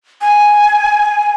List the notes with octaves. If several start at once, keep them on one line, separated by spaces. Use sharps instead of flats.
G#5